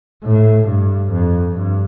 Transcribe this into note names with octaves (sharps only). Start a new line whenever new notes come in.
A2
G2
F2
G2